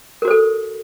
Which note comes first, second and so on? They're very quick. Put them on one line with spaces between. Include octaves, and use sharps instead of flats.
A#4 F#4 C5 A4